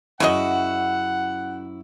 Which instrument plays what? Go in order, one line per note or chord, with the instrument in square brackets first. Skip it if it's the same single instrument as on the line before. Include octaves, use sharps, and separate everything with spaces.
[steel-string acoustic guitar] F#2 E4 [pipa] C#3 F#4 D#5 [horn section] F#5